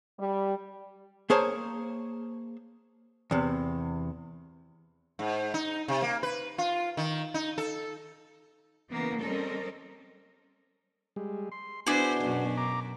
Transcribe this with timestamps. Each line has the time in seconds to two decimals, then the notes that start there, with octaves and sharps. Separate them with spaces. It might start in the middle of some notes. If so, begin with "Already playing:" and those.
0.19 G3
1.30 A#3 G#4 C5 C#5 A5
3.31 E2 C3
5.19 G#2
5.54 D#4
5.88 C3
6.02 A#3
6.23 B4
6.58 F4
6.97 D#3
7.34 D#4
7.58 A4
8.90 C#3 E3 A#3 B3
9.22 G3 C4 C#4 A4 A#4 D#5
11.16 G3 G#3
11.52 C6
11.87 B3 D4 E4 F#4 G#4 C5
12.20 F#2 B2
12.57 A#5 D6